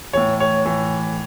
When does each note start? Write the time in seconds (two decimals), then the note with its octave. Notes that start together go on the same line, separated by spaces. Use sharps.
0.13 A2 E3 C#5
0.40 C#5
0.65 A2 E3